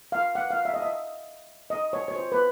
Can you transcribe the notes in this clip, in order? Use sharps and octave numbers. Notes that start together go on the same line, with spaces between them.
F5
F#5
F5
E5
D#5
E5
D#5
C#5
C#5
C5
B4